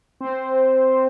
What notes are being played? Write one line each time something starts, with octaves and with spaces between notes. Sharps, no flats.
C4 C5